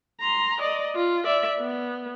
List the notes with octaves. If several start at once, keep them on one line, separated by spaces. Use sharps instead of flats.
A#5 C6
D5 D#5
F4
D5 E5
B3